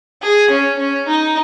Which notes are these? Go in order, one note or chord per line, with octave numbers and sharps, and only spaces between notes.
G#4
C#4
C#4
D#4